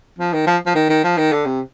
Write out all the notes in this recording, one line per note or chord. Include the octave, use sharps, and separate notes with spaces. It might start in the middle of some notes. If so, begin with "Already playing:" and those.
F3
D#3
F3
F3
D#3
D#3
F3
D#3
D3
C3